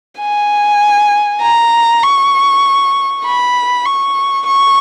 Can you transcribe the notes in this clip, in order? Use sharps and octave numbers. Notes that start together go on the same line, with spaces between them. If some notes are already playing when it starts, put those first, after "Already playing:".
G#5
A#5
C#6
B5
C#6
C#6